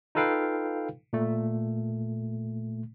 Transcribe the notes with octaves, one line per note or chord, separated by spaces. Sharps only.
D#4 F4 A4 B4 F5 G5
A#2 A3